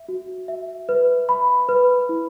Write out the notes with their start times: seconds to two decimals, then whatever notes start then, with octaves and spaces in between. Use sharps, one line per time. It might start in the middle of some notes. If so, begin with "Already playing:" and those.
Already playing: E5
0.09 F#4
0.48 E5
0.89 B4
1.29 B5
1.69 B4
2.09 E4